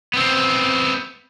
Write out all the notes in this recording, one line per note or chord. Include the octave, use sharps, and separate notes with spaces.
B3 C4